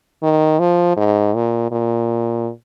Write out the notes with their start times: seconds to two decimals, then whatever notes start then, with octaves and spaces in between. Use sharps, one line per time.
0.23 D#3
0.59 F3
0.97 G#2
1.35 A#2
1.72 A#2